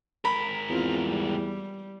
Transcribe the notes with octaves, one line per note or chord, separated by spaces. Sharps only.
G#2 A#4 B5
E2 C4 F4
G3